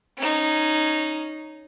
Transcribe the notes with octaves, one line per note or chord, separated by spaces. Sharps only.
C#4 D#4